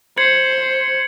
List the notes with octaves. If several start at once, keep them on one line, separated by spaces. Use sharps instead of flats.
C5 G#6 C#7 F#7